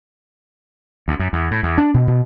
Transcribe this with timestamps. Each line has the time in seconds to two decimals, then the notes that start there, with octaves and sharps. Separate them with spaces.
1.08 D2
1.19 F#2
1.33 E2
1.51 A2
1.63 E2
1.78 D4
1.94 B2
2.07 B2